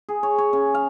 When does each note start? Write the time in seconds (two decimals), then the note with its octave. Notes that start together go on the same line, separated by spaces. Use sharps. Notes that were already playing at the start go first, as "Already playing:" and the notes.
0.09 G#4
0.23 C#5
0.38 C#5
0.53 C#3
0.74 F5